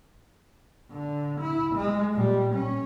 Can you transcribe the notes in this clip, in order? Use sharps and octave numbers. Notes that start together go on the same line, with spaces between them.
D3
E4
G#3
A#2 G3
C#4